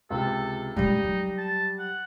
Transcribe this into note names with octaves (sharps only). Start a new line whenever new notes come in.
C#2 C3 A4
C#3 G3 G#3 D#4 G4
F#3
A5
F#5